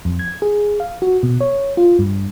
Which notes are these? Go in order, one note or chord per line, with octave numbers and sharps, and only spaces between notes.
F2
G#6
G#4
F5
F#4
B2
C#5
F4
G2